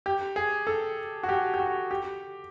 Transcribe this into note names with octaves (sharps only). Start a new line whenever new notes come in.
G4
G#4
A4
F#4
G4
G4
F#4
G4